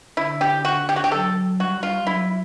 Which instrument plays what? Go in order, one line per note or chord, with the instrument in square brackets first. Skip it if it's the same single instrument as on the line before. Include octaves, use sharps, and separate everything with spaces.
[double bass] D3 [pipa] E4
[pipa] G4
F#4
G4
F#4
G4
[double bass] F#3 [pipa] A4
[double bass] G3 [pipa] F#4
[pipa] F4
[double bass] F#3 [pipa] E4